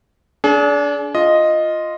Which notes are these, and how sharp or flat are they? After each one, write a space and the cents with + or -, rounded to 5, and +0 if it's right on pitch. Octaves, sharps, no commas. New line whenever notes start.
D4 -25 G#4 +35
F4 +0 D#5 +0